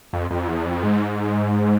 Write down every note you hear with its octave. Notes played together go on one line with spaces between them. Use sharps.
F2
F2
E2
F2
G#2